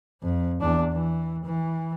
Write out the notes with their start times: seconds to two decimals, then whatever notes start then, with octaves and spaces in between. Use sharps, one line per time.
0.22 F2
0.61 E2 D4
0.92 E3
1.45 E3